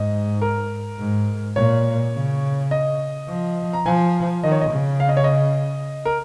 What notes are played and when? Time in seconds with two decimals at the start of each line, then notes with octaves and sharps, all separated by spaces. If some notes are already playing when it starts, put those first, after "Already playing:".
Already playing: G#2 D#5
0.42 A#4
0.99 G#2
1.56 A#2 C#5
2.14 C#3
2.71 D#5
3.28 F3
3.73 A#5
3.85 F3 G#5
4.43 D#3 D#5
4.52 C#5
4.61 D#5
4.71 C#3
5.00 F5
5.09 D#5
5.17 C#5
5.24 D#5
6.05 A#4